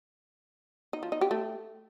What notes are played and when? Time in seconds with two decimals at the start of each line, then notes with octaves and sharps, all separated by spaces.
0.93 D#4
1.03 F3
1.12 D#4
1.21 G4
1.31 A3